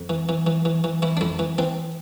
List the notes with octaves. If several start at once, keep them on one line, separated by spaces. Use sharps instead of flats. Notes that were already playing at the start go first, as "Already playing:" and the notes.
Already playing: F2
E3
E3
E3
E3
E3
E3 E4
D4
F2 E4
E3
E3 C4